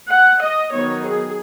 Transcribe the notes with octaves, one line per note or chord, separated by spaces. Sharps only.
F#5
D#5
D#3 F#3 B3 D#4 C#5
G#4